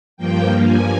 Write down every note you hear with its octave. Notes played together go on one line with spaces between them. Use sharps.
G2 F3 A#3 G5
G#5